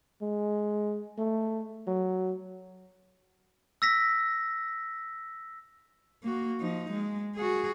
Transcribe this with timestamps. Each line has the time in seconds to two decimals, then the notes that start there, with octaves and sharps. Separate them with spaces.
0.22 G#3
1.18 A3
1.87 F#3
3.82 E6 A#6 B6
6.23 A#3 F#4
6.61 F3 D#4
6.92 G#3
7.35 F#4 G#4